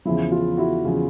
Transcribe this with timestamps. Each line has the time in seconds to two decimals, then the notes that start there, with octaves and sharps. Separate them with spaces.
0.05 E2 C#3 F3 E4
0.32 F4
0.57 E4 F#4
0.84 E2 C#3 F3